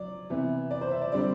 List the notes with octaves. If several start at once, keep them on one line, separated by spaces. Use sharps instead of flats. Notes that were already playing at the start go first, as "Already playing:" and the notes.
Already playing: F#3 D5
C3 E3 B3
D5
C5
E5
D5
D3 G3 C4 D5